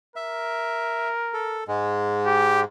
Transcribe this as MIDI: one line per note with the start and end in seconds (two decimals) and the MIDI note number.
0.16 1.62 70
0.16 1.09 76
1.34 1.64 69
1.68 2.64 44
1.68 2.64 56
2.26 2.61 67